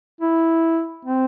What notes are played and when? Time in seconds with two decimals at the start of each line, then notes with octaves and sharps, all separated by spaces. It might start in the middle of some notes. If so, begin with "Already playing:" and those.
0.21 E4
1.05 C4